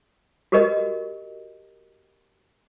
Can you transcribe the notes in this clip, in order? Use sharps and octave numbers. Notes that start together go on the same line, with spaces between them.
F#4 G4 A#4 B4 D#5